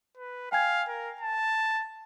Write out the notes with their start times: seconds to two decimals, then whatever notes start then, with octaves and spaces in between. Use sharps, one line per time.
0.18 B4
0.52 F5 G5 G#5 G#6
0.89 A#4
1.21 A5